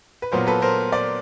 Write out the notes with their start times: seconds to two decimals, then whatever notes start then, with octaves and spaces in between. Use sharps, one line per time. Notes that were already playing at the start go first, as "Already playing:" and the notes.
0.22 B4
0.32 A#2 F#3 B3 A#4 C5
0.47 A4 B4
0.62 A#4 C5
0.92 C5 D5